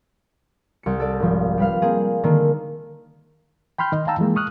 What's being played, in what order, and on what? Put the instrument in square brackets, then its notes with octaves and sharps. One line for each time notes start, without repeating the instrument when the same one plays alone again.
[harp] C2 C#7
A4 D5
G#1 F3
G3 B4 F5
A#3 C4 G#4
D3 D#3 A#3
[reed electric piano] G5 B5 C6 F6 G6
D#3 D#5
F5 G5 A5 A#5 E6
E3 F3 G#3 A#3
C#6 D#6 F6 F#6